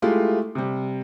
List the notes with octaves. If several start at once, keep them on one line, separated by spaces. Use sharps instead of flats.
G#3 A3 E4 F4 G4
C3 G3